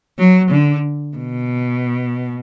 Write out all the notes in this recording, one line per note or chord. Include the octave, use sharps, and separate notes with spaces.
F#3
D3
B2